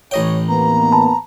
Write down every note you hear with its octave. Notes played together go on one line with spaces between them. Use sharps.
A1 C#5 D#5 G5
D#2 A#3 B3 A#5
A5 B5